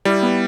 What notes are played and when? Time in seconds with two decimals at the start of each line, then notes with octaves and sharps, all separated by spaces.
0.05 G3 E4
0.23 B3